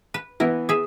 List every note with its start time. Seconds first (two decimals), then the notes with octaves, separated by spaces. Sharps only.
0.14 B4
0.40 E3 B3 E4 A#4
0.69 G#4 E5